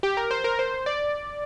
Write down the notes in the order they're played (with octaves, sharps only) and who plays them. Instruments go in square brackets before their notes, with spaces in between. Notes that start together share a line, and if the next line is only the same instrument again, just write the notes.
[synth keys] G4
A#4
C5
A#4
C5
D5